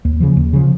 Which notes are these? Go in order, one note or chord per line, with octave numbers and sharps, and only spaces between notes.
D#2
C#3 F3
D#2
C#3 F3